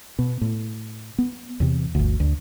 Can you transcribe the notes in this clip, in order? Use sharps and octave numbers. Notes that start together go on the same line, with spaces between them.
B2
A2
B3
E2 C3
G1 D2
D2